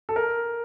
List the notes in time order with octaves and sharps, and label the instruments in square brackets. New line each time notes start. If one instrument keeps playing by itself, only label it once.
[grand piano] A4
A#4